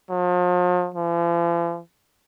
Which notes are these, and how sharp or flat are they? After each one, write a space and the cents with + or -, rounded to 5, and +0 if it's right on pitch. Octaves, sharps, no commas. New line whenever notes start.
F3 +40
F3 -45